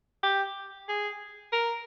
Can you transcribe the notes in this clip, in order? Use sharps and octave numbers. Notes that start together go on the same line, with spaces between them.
G4
G#4
A#4